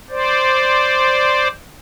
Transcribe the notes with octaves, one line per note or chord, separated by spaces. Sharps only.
C5 D5